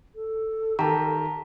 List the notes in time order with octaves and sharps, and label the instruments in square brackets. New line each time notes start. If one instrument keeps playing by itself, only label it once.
[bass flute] A4
[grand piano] D#3 G4 [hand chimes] A5 A#5